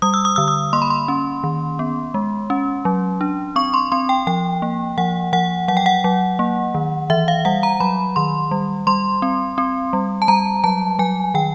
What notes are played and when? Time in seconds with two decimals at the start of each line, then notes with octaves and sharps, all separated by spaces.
0.02 G3 D#6
0.14 E6
0.25 D#6
0.36 D3 E6
0.48 D#6
0.73 A#3 C6
0.82 B5
0.90 C6
1.08 C#4
1.44 D#3
1.79 B3
2.14 G#3
2.50 C#4
2.85 F#3
3.21 D4
3.56 C4 C#6
3.74 C6
3.92 C4 C6
4.09 G5
4.27 F3 G5
4.62 A#3
4.98 F3 F#5
5.33 F3 F#5
5.68 F#3 F#5
5.77 G5
5.86 F#5
6.04 F#3
6.39 A#3
6.74 D#3
7.10 E3 E5
7.28 F5
7.45 G3 F#5
7.63 A#5
7.80 F#3 B5
8.16 D#3 C6
8.51 G3
8.87 G3 C6
9.22 C4
9.58 C4
9.93 G3
10.22 A5
10.28 G3 A#5
10.64 F#3 A5
10.99 F#3 G#5
11.34 D#3 G5